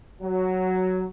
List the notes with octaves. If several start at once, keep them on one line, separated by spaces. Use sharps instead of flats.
F#3